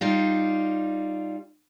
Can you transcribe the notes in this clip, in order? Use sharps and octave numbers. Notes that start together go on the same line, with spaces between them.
G3 D#4 F4